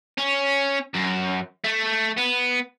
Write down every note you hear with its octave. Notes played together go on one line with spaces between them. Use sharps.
C#4
F#2
A3
B3